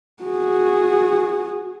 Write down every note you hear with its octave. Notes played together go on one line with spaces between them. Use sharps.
F#4 G#4